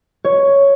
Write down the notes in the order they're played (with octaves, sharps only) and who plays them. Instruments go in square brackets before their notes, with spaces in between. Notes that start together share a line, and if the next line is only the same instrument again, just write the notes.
[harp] C#5